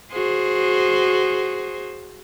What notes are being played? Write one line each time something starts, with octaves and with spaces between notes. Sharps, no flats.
F#4 G#4 C5